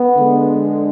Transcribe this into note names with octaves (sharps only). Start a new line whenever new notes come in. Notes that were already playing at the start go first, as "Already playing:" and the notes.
Already playing: B3
D3 G#3